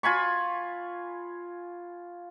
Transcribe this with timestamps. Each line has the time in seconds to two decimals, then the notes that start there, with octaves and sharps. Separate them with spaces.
0.03 F4 G#5 B5 C#6